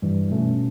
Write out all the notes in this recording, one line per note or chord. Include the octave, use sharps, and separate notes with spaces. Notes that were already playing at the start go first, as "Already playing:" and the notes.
G2 E3 G3
B2 A3 C#4